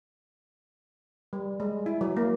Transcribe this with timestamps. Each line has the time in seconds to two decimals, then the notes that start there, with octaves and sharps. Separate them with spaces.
1.33 G3
1.60 G#3
1.86 E4
2.01 F#3
2.17 A#3